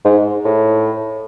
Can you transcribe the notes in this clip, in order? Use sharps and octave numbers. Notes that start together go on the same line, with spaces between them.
G#2
A2